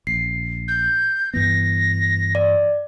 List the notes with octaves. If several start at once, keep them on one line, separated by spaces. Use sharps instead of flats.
A#1 C7
G6
G2 E3 B3 A#6
D5